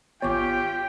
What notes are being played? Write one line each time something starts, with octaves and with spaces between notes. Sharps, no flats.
G#1 B3 F4 G4 C#5 G5 C#6 D6